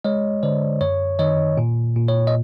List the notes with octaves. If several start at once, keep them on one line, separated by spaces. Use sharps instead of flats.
G#3 C#5 D#5
D3 C5 D5
F#2 C#5
D#3 C#5 D#5
A#2
A#2
C#5
D#5